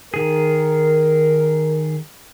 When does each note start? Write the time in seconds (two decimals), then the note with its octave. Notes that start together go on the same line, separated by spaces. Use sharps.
0.14 D#3 G#4 A#4